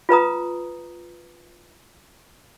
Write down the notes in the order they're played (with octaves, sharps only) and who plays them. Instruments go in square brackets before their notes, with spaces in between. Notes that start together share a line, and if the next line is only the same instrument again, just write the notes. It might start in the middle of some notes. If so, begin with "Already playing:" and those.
[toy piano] F4 B4 A#5 D#6